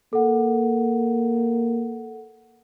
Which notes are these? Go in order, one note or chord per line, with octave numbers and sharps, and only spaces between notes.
A#3 A4 F#5